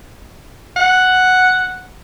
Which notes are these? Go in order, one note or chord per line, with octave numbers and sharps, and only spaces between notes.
F#5